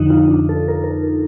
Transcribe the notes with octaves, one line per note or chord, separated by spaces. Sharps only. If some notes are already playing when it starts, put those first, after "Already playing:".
Already playing: F2 D3 F3 D#4
F4
D4
A4
A#4
A#4